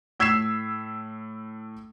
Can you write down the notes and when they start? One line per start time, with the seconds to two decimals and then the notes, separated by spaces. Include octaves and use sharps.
0.20 A2 E6 G#6 B6 C7 E7